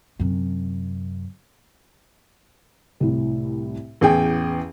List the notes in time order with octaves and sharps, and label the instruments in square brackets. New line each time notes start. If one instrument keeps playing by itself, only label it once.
[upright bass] F#2 C3
[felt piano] C2 A2
[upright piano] A1 G#4 G5 [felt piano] E2